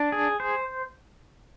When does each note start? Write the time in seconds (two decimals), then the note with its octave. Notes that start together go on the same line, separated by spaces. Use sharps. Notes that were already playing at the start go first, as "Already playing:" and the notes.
Already playing: D4
0.12 G#4
0.40 C5